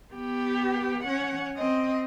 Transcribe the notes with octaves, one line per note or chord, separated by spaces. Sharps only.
B3 G4
C#4 F#5
C4 D#5